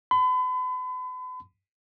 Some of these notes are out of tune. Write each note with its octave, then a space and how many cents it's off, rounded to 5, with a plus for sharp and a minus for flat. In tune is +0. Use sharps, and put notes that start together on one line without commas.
B5 +40